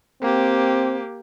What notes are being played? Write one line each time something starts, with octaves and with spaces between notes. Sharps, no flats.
A#3 C4 G4